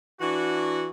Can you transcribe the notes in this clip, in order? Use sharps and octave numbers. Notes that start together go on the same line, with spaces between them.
E3 D4 F#4